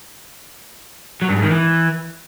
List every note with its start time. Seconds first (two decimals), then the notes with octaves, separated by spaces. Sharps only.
1.22 F#3
1.29 G2
1.36 G#2
1.43 D#3
1.50 E3